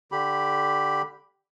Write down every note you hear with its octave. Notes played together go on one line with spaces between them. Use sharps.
D3 G4 B5